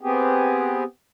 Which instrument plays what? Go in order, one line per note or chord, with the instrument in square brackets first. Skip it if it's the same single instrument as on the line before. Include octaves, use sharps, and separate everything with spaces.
[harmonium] B3 C4 G4 G#4